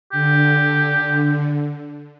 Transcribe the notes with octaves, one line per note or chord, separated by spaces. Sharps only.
D3 G4